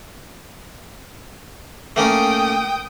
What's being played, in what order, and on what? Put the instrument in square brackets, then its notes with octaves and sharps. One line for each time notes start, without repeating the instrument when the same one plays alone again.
[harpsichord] A3 A#3 C#4 [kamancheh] G5 D#6